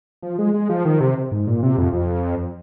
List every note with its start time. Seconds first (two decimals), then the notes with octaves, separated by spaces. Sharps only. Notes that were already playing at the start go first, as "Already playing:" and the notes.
0.23 F3
0.39 G#3
0.54 G#3
0.69 F3
0.85 D#3
1.00 C3
1.32 G#2
1.47 A#2
1.63 C3
1.78 F2
1.93 F2